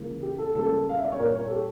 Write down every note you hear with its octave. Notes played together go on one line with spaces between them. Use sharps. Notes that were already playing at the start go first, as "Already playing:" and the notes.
Already playing: C#2 C#3 E3 A#3
G4
A4
C#2 C#3 G3 A#3 A4
F5
E5
D5
C#5
A#2 G3 A#3 A#4
C#5
A4
G4